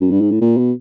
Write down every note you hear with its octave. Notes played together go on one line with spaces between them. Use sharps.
F#2
G2
G#2
A2
A#2
B2